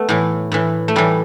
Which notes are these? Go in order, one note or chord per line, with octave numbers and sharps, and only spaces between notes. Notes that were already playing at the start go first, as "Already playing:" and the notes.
Already playing: A3 B3
A2 E3
A2 E3
A3
A2 E3 G3